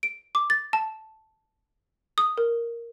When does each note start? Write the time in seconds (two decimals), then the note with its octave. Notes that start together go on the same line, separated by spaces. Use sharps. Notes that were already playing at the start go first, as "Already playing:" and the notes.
0.03 D7
0.35 D6
0.50 A6
0.73 A5
2.18 D#6
2.38 A#4